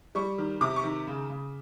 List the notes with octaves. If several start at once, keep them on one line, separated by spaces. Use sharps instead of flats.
G3 C#6
D#3
C3 D6
C#6
D#3
C#3
C#3